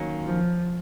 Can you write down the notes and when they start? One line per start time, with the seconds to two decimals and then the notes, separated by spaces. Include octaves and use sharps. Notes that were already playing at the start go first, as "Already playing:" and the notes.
Already playing: D#3 F#3 A#3 C#4
0.23 F3